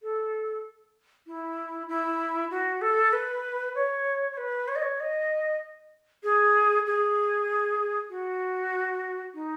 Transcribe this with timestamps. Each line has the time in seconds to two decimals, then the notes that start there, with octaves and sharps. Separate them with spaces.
0.03 A4
1.27 E4
1.88 E4
2.51 F#4
2.82 A4
3.13 B4
3.75 C#5
4.32 C#5
4.37 B4
4.68 C#5
4.76 D#5
4.82 C#5
5.00 D#5
6.24 G#4
6.86 G#4
8.10 F#4
9.34 D#4